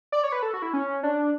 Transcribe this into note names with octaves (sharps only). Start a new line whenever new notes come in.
D5
C#5
B4
A4
F#4
E4
C#4
D4